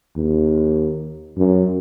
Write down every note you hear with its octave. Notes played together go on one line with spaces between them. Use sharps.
D#2
F#2